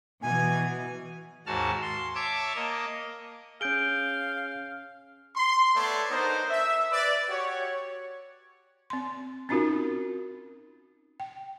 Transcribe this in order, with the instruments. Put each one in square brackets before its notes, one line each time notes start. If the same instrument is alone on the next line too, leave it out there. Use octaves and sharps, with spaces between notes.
[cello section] B2 E3 [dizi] G#5
[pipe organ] D#2 G#2 F#4 A5 F6
C6
C#5 E5 A5 D6
A#3 D#5
[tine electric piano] C#4 G#4 [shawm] F5 [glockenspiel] G6 D7 G7
[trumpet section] C6
A3 B3 C#5 D5
B3 D4 D#4 A#4 C5
E5
B4 D5
F#4 G4 C#5
[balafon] C4 C6
C4 C#4 D#4 F4 F#4 A#4
G5